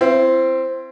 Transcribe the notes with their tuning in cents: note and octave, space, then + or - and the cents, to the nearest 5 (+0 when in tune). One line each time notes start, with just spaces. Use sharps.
C4 +0 E4 +35